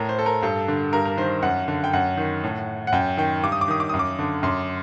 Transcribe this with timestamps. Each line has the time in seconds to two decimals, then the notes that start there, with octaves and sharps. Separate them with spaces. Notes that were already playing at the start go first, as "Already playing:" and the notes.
Already playing: A2 A#4
0.09 C5
0.19 A4
0.26 A#4
0.42 G2 A4
0.68 D3
0.93 G2 A#4
1.05 A#4
1.17 D#3 C5
1.43 F#2 F#5
1.68 D3
1.84 G5
1.93 F#2 F#5
2.17 D#3
2.43 A2
2.87 F#5
2.92 F#2 G5
3.17 D#3 G5
3.43 G2 D6
3.52 D#6
3.61 D6
3.68 D#3 D#6
3.80 D6
3.89 F#2 D#6
3.99 D6
4.19 D3
4.43 F#2 C6